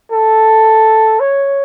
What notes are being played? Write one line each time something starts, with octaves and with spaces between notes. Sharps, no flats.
A4
C#5